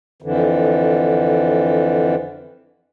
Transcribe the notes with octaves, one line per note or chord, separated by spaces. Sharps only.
F2 D3 E3